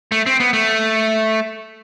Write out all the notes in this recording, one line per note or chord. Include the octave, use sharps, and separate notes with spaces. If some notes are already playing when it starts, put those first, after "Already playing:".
A3
C4
B3
A3